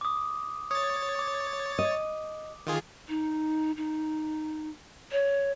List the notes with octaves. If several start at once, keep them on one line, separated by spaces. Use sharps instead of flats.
D6 D#6
C#5 D#6 A6
D6
D#5
D#3 F4 G#4
D#4
D#4
C#5